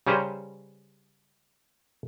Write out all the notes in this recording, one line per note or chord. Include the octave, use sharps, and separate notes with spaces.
C#3 G3 C#4 B4 C5 A#5